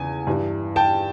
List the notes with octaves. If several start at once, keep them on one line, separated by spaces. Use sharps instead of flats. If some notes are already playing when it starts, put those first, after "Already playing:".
Already playing: E2 C#3 G#5
G2 E3
G5 A5